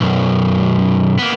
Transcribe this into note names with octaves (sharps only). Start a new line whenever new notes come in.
B1 F#2
A#3 B3